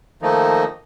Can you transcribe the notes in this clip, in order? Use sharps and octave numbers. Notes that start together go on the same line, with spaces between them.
D#3 F3 A3 A#3 D#4